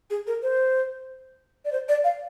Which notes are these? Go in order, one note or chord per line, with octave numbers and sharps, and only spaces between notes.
G#4
A#4
C5
D5
C5
D5
F5